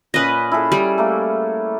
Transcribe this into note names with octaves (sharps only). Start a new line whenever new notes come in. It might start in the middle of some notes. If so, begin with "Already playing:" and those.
A#2 C#4 B4 D#5
E4 G#4 A4
G3
A3 A#3 A4